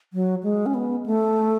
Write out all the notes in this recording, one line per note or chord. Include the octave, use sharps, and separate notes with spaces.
F#3
G#3
C#4
B3
A3